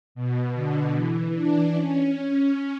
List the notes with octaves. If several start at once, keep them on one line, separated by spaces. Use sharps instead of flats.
B2
D3
E3
D4
C#4